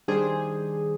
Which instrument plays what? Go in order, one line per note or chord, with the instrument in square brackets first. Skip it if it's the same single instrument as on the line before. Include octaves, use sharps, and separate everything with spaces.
[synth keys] D#3 G3 D4 G#4 C5